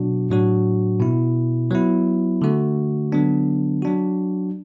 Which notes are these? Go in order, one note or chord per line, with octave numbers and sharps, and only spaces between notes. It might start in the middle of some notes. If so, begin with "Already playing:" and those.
Already playing: B2 F#3 D4 F#4
A2 F#3 D4 F#4
B2 B3 E4
F#3 B3 E4
D3 A3 F#4
D3 F#3 B3 D4
F#3 D4 F#4